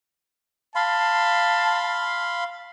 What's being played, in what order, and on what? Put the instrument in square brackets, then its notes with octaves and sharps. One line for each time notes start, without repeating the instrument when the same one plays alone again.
[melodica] F5 B5 C6 [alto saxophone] A5